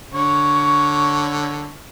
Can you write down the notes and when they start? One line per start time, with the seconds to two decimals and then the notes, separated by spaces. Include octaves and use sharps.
0.13 D3 C#5 C#6